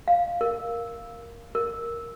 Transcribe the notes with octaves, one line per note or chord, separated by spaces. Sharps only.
F5
A#4
A#4